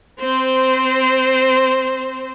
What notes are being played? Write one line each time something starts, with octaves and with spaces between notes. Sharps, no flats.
C4 C5